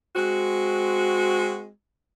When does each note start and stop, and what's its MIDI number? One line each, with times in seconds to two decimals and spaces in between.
0.16 1.68 56
0.16 1.68 60
0.16 1.68 66